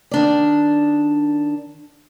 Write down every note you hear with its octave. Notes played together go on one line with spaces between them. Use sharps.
D#3 D4 D5